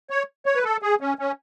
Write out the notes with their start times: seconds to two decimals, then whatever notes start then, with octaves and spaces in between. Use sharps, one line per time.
0.10 C#5
0.46 C#5
0.55 B4
0.64 A4
0.82 G#4
1.01 C#4
1.19 C#4